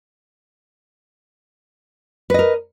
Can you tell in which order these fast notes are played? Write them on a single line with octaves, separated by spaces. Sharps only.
B4 D#5 A#4